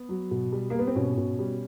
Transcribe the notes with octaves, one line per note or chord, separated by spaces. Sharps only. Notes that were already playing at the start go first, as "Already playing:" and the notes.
Already playing: B3
F#3
B2
G3
A#3
G3 B3
C4
B2 C#4
B2
G3